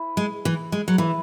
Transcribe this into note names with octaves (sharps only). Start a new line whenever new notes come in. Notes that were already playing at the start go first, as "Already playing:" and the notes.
Already playing: E4 B4
G#3
E3
G#3
F#3
E3 E4 B4 E5